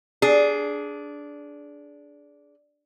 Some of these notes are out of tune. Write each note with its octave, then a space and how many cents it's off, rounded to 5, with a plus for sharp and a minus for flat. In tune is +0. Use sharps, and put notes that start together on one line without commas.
D4 -10 G#4 +10